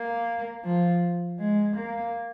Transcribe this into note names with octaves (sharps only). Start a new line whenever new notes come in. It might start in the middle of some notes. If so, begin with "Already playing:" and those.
Already playing: A#3
F3
G#3
A#3